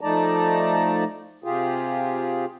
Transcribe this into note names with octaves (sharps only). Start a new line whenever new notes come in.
F3 A3 D#4 D5 A5 A#5
C3 F4 G4 G#4